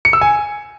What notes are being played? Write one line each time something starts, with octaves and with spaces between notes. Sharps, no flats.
C#7
E6
G#5